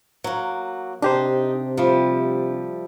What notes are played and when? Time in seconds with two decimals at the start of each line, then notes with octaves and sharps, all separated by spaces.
0.24 F#3 A#3
1.02 C3 D4 D#4 G4 C5
1.77 F3 G3 A3